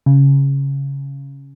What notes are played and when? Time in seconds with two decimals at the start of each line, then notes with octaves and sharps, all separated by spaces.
0.06 C#3